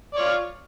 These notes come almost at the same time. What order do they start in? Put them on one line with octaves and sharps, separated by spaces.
D5 C#5 F4